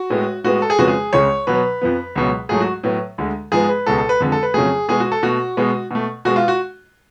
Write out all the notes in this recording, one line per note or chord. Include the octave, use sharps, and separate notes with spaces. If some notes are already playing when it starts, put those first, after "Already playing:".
Already playing: F#4
A2 G#3 B3
A2 G#3 B3 F#4
A4
G#4
F2 C#3 F3 G#3 B3 F#4
G#4
C#2 C#3 G#3 C#5
B2 F#3 B3 B4
F2 F3 B3
C#2 B2 F#3
G#2 F#3 A3 G#4
F#4
A2 F#3 B3
D2 D3 G#3
G#2 F3 G#3 B3 G#4
B4
C#2 B2 G#3 B3 A4
A4
B4
F2 D3 G#3
A4
B4
F2 C#3 F#3 A3 G#4
B2 G#3 B3 G#4
F#4
A4
B2 A3 F#4
B2 G#3 B3
B2 A3
B2 G#3 B3 F#4
F4
F#4